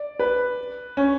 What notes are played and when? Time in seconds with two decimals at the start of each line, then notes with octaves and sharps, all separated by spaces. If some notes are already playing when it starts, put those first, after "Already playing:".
Already playing: D5
0.19 B4
0.97 C#4